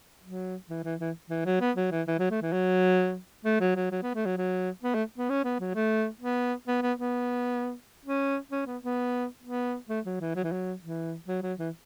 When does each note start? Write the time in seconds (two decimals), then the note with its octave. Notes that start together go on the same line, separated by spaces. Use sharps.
0.24 F#3
0.70 E3
0.84 E3
1.00 E3
1.30 E3
1.45 F#3
1.61 B3
1.76 F#3
1.91 E3
2.07 E3
2.19 F#3
2.31 A3
2.42 E3
2.53 F#3
3.45 A3
3.60 F#3
3.76 F#3
3.91 F#3
4.03 B3
4.15 A3
4.25 F#3
4.38 F#3
4.84 B3
4.95 A3
5.18 B3
5.30 C#4
5.45 B3
5.60 F#3
5.75 A3
6.21 B3
6.68 B3
6.82 B3
6.98 B3
8.05 C#4
8.51 C#4
8.67 B3
8.82 B3
9.43 B3
9.89 A3
10.06 F#3
10.20 E3
10.36 F#3
10.44 E3
10.52 F#3
10.82 E3
11.28 F#3
11.43 F#3
11.59 E3